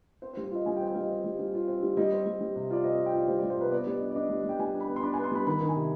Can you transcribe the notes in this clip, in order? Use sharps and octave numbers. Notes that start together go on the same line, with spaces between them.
C4 C5
C5
G3
C5
F4 D#5
G3 G#5
G5
C4
G5
G3 D#5 F5
C4
G3
G3
F4
C4
G3
G3 D#5
C4
G3
G3
C3
F4 D5
C4 D#5
C4
G5
F4 D5
G3 C5
G3 D5
C5
C3 B4
B3 D5
G3 D5
D#5
D4
D5
D4 D#5
G3
G3
G5
G3 G#5
D4
B5
B3
C6
D4 B5
B3 G#5
C6
G3 B5
D#3 B5
D#3
G#5
C3